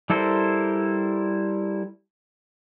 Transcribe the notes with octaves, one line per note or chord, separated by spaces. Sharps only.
G3 E4 A4 A#4 C5